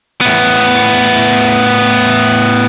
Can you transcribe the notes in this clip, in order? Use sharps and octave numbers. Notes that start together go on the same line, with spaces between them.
A2 B3